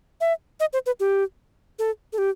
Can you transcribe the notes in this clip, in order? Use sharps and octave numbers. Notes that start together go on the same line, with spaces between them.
E5
D#5
C5
B4
G4
A4
A4
G4